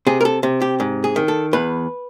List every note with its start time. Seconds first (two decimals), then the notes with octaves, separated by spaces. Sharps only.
0.07 C3 G#4
0.21 A#4
0.25 A4
0.43 C3
0.62 G4
0.80 G#2
1.04 G#4
1.16 D#3
1.28 A4
1.53 E2 B4